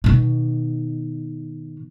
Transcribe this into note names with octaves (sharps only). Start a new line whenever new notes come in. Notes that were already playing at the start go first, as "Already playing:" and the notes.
B2 D#3